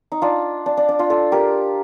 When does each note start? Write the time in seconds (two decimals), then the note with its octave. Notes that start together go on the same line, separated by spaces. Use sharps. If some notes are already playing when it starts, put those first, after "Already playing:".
0.12 D#4
0.22 D4 F4
0.66 D4
0.77 D4
0.89 D4
0.99 D4 F4
1.10 F4 A4
1.32 G4 A#4